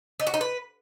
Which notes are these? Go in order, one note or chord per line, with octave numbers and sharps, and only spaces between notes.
D#4
F#4
D#4
B4